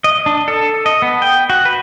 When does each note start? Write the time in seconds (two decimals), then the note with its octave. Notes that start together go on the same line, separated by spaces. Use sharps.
0.04 D#5
0.26 D4
0.48 A4
0.86 D#5
1.02 B3
1.22 G5
1.50 F#4
1.65 B4